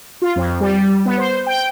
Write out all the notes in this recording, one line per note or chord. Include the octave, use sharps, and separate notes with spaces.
F4
F2
G3
B3
C5
G5